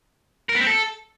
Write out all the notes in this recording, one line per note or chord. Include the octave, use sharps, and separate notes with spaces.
A#4
B3
C4
A4